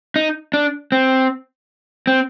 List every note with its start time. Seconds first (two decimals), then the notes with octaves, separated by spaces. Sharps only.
0.16 D#4
0.54 D4
0.92 C4
2.07 C4